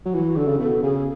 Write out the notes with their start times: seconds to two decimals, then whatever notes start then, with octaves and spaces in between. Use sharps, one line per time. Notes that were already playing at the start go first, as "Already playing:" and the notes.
0.06 F#3
0.13 E3 F#4
0.36 D3 A4
0.48 C#3
0.59 B2 A4
0.82 C#3 G#4